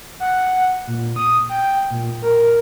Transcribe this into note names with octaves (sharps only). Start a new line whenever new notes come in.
F#5
A#2
D#6
G5
A#2
A#4